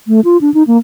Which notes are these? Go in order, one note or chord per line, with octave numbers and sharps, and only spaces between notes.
A3
F4
D4
D#4
A#3